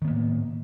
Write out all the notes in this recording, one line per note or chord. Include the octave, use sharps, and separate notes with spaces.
A2 D#3 A#3 B3